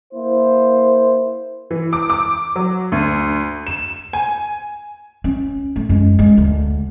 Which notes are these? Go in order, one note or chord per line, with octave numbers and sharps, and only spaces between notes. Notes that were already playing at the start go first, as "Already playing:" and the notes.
A#3 E4 C5
E3
D6
D6
F#3
D2
E7
G#5
C#4
A3
F#2 G#3
G#3
D2